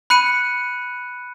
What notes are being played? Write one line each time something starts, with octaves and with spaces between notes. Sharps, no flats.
B5 F#6 C#7 D#7